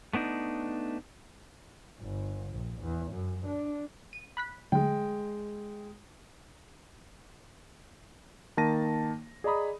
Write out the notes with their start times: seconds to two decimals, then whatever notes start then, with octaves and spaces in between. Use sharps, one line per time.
0.13 A3 B3 D4 D#4
2.01 G1
2.52 A#1
2.81 E2
3.12 F#2
3.46 D4
4.13 D#7
4.37 B5 F#6 B6
4.72 D3 F#3 G#3 A3 G5
8.57 D#3 A#3 A5 A#6 D#7
9.44 G#4 D5 D#5 A#5 B5 D#6